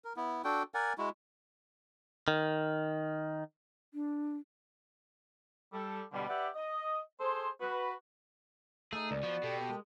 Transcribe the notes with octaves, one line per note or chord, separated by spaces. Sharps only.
A#4
B3 E4
D4 F#4 A4 G5
A#4 D5 F#5 G#5
G#3 E4 F#4
D#3
D4
G3 A4
B2 D3 G3
G4 B4 D5 E5 F#5
D#5
G#4 A4 C5
F#4 B4
A3 D#4 G#4
C#2 D5
F3 B3 F#4
B2 G4 A4 G5
G#3 A#4